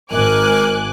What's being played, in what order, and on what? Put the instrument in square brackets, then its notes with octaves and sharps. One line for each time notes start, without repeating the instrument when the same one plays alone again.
[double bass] G#1 G#2 [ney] A#4 [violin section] G#5 D6 F#6